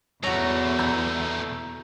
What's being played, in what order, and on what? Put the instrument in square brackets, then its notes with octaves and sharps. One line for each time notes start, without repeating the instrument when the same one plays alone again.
[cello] E2 [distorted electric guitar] B2 A3 [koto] F#4 A#5 [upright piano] C#5
[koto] E5 [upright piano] A#5 G6